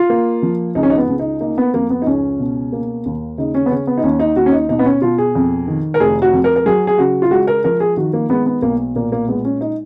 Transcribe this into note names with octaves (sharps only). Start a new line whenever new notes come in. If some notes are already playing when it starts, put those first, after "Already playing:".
Already playing: F4
A#3
F3
C#2 D#4
C#4
D#4
B3
C#2
D#4
A#3 D#4
B3
F2 A#3
B3
D#4
C#2 C#4
B2
A#3
D#2
C#3 D#4
C#4
B3
C#3 C#4
B3
D#4
D#2 C#4
D#4
D#2 F#4
C#4
D#4
B2 D#4
B3
C#4
B2 F4
G#4
F2
D#3
A#4
F1 G#4
F#4
F2
A#4
A#4
F#3 G#4
G#4
C#3 F#4
F4
G#3 F#4
A#4
F3 A#4
G#4
D#3 F#4
A#3
G#3 B3
B3
B1 A#3
A#2 A#3
A#3
G#3 B3
C#4
D#4